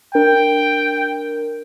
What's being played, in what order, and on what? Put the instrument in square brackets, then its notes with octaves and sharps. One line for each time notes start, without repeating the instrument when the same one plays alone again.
[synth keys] D4 A#4 [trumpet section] G5